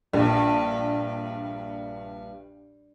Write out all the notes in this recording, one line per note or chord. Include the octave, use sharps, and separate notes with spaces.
A#1 G2